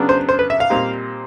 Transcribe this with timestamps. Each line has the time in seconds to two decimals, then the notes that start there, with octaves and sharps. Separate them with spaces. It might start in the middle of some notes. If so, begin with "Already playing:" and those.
Already playing: C#3 F#3 B3 D4
0.09 C5
0.29 C5
0.39 B4
0.50 E5
0.60 F5
0.70 A#2 G3 C4 D#4